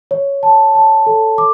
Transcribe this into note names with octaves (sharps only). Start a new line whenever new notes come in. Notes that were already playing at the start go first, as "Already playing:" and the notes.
C#5
A5
A5
A4
D6